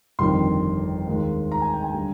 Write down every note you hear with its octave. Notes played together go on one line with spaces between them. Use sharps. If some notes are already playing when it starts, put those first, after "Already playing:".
G1 F2 D#3 G3 C6
D#2 D#3 G#3
A#5
G#5
G5
G#5
D3 G3